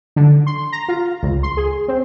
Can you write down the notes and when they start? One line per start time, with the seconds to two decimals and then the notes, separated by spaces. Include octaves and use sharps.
0.16 D3
0.47 C6
0.73 A#5
0.88 F4
1.23 C#2
1.43 C6
1.57 G#4
1.88 C4